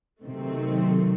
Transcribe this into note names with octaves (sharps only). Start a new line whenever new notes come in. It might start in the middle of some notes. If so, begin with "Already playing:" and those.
C3 D#3 F#3 A3 C4